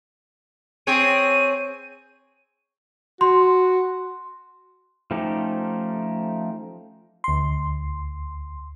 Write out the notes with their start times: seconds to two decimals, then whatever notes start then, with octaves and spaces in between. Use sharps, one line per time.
0.87 C4 G#4 C#5 D#7
3.21 F#4 C6
5.11 F3 A3 C#4 D#4 G4
7.24 D2 C6